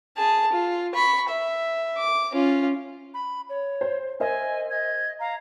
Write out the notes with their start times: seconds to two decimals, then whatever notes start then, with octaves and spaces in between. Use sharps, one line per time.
0.16 G#4 A5
0.52 F4
0.94 B5 C#6
1.28 E5
1.97 D6
2.32 C#4 F4
3.14 B5
3.49 C#5
3.81 C5
4.20 A#4 C5 D#5 E5 G#5
4.70 D#5 G#6
5.20 F5 A#5